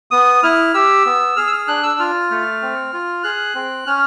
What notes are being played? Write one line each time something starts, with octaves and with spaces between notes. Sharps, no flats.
B3 D#6
E4 F6
G4 E6
B3
G#4 F6
E6
F6
D4 F#6
E6
F4 F6
A3
C4
F4
G#4 F#6
C4
C#4 F6